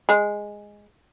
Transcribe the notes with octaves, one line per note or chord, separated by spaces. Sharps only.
G#3